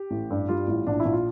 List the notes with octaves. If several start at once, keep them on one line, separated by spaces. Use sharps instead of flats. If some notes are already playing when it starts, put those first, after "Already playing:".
Already playing: G4
A1
G2
G3 F4
A1
A#1 D4
E4
A#1
F4